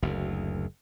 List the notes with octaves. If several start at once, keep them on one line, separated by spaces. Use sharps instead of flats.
F#1 D2